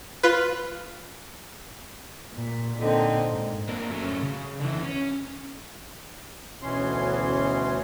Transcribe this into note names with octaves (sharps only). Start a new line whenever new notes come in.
F4 B4
A#2
A#2 D3 C4 D#4
G#2
A#3 C4 D4 A#4
F#3 A3 C#4
C#3
D3 E3
C#4
D2 B2 E3 C#4 C6